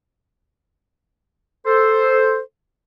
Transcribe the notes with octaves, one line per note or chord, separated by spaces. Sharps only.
A4 C5